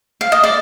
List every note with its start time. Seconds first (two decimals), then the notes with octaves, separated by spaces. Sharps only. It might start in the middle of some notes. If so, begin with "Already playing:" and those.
0.21 F5
0.32 D#5
0.44 D5